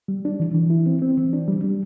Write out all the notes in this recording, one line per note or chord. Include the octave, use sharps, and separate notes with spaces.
G3
D4
E3
E3
E4
C4
C4
E3
D4
G3
G3